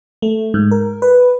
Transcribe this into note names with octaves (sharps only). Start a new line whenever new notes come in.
A3
G#2
A#4
B4